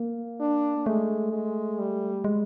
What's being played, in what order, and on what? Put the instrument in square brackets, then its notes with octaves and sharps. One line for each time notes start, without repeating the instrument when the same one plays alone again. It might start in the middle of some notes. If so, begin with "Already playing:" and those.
Already playing: [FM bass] A#3
[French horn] D4
[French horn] G#3 [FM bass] A3
[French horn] G#3
G3
[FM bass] G#3